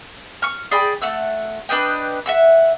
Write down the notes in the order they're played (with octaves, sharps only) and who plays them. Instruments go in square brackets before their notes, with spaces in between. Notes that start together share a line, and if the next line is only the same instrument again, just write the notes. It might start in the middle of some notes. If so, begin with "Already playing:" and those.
[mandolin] C#6 F6
G#4 D5 G5 B5
A3 F#5 E6
D4 B4 D#5 G5
E5 F#5 E6